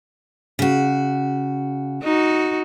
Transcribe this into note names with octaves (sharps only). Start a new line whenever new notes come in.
C#3 F#4
D#4 F#4